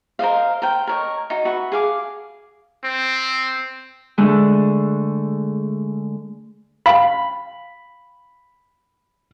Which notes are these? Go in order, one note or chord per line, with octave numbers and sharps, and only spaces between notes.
A#4 C5 D#5 F5
A#4 C5 G5
A#4 C#5 D#5
D#4 F#4
F#4 B4 E5
G#4 F5 D6
C4
D3 G#3 A3 D4
F5 G5 B5